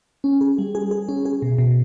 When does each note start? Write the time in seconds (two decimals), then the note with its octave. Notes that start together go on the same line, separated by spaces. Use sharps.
0.24 C#4
0.41 G#4
0.58 G3
0.75 G#4
0.91 G#4
1.09 C#4
1.25 G#4
1.42 B2
1.58 B2